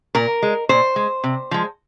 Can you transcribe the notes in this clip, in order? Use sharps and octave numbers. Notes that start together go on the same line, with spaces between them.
A#2 A#4
G#3
A#2 C5
G#3
C3
F3 G#3